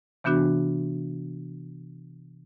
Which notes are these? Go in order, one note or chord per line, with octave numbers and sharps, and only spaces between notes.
C3 E3 B3 D4 F#4